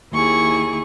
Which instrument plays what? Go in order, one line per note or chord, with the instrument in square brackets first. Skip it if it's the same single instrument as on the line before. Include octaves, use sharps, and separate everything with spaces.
[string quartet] D#2 E4 G#4 C#6